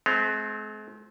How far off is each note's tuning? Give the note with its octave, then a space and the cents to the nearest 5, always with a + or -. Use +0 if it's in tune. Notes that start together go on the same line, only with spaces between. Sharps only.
G#3 +45 C4 -5